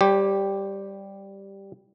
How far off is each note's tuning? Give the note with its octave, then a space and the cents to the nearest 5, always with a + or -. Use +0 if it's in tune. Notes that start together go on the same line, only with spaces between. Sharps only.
G3 +0 G4 +0 C#5 -40